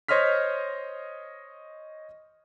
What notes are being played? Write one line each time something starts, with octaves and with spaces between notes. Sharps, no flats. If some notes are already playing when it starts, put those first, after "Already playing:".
C5 C#5 D#5 C6 F6 B6